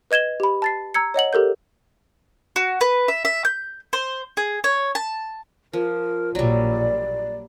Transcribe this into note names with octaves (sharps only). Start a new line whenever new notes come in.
B4 D#5 G#6 E7 G7
G4 B5
A5 A6 C7
A#5 E6 G#6 C#7
C#5 D#5 F#5 F#7
G4 A4 A#4 G6
F#4
B4
E5
E5
G6
C5
G#4
C#5
A5
F3 A#4
A#1 A#2 F#3 G3 D5